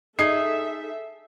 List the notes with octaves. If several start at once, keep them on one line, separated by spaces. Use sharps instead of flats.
D#4 G#4 A4 E5 C7